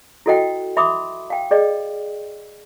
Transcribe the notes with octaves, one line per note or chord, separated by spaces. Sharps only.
E4 F#4 A4 D#5 F#5 G5
E5 B5 C6 D6 D#6
F5 G5
G#4 D5 D#5 G5